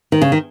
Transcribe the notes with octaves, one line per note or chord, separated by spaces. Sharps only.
D#3
C#3
D#3